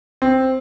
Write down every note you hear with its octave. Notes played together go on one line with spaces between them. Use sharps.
C4